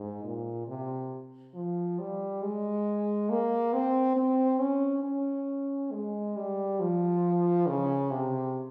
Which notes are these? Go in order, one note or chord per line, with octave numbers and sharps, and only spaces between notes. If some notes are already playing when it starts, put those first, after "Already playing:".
Already playing: G#2
A#2
C3
F3
G3
G#3
A#3
C4
C4
C#4
C#4
G#3
G3
F3
C#3
C3